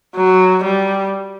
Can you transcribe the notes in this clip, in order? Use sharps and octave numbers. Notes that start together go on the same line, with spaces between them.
F#3
G3